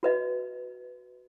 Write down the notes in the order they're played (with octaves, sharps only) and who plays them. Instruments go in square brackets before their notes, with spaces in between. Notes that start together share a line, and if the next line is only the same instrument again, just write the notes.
[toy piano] F#4 B4 D#5